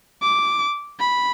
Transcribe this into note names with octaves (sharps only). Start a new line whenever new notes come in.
D6
B5